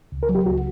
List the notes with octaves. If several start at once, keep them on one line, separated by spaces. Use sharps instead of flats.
C#2
A#4
F#3
G4
C#2 F#4